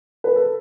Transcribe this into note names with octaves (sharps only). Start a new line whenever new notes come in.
B4
A4